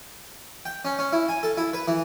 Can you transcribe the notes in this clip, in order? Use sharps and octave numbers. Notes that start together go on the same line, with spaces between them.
G5
C#4
C#4
E4
G#5
A4
E4
B4
E3